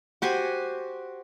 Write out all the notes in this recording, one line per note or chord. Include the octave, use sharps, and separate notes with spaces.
F#4 G4 C5 G#5